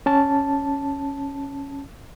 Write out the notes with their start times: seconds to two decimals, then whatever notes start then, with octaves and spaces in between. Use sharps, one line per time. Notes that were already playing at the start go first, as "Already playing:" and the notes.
0.06 C#4 A5